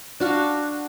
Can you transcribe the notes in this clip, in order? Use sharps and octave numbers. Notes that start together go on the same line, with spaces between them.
D4 F#4 F5